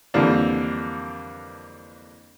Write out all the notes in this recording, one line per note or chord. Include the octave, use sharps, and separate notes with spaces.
F2 D3 E3 G3 A#3 D4